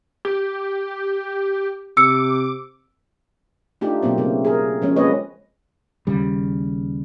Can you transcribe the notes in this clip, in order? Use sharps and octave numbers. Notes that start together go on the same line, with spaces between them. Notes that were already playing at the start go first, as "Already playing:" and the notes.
G4
C3 D6 E6 C#7
A3 D4 D#4 F4 G4
B2 F#3 A#3 C4
C#3 A3
G#4 A#4
F3 G#3 C#4
G#3 A#3 C4 B4 C#5 D#5
D#2 C#3 G3